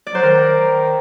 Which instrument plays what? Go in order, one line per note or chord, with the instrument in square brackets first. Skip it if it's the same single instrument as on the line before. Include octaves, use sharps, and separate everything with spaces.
[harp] D5
[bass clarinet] F#3 [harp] C5
[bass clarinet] D#3 [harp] A#4